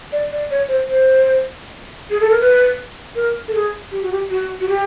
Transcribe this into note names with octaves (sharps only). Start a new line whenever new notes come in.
D5
D5
C#5
C5
C5
G#4
A4
A#4
B4
A#4
A4
G#4
G4
F#4
G4
F#4
F#4
G4